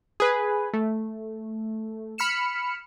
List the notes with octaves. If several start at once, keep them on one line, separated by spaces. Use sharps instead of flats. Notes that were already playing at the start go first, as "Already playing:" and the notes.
G#4 B4
A3
B5 F6 C#7 E7